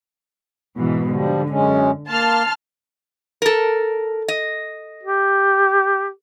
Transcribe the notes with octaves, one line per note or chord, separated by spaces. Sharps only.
G#2 B2 E3
D3 F3 G3
F#2 G#3 C#4
A#3 A5 C6 F6
A4 A#4
D#5
G4